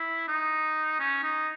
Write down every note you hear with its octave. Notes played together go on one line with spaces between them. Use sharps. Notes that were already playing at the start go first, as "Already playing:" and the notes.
Already playing: E4
D#4
C#4
D#4